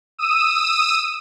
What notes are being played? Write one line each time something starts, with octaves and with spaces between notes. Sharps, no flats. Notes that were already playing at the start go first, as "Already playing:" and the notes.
D#6 E6 D#7